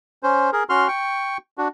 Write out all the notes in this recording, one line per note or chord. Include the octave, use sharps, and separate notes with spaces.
C#4 C5
G#4 A#4
C#4 F#4 C6 F6
G5 C#6
D4 F#4